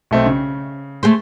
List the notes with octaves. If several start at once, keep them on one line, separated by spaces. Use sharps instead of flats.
B1 A3 C4
C#3
A3 G#4 C5